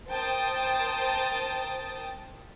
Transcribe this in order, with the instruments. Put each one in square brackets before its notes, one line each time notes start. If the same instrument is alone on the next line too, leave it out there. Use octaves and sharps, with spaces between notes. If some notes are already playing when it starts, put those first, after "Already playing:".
[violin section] A#4 C5 G5 A5 D#6 A6